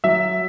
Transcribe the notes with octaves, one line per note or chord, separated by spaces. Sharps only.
F#3 E5